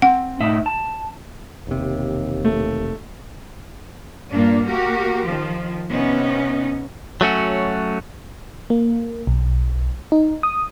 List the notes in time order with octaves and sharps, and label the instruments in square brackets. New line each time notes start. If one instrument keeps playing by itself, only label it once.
[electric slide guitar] C4 [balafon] F#5
[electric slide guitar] A2 D#4 E5
A5
[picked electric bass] E1 C3 [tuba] D#2
[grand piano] A3
[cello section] G2 A#2 A#3 D4
A#3 F#4 G4 A#4
D#3 F3
C3 B3 C#4 D#4
[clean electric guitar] F#3 A3 C#4 F#4
[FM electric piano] A#3
B1
D#4
D#6